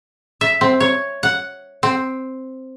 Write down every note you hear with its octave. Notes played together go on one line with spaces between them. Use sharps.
E5
C4
C#5
F#5
C4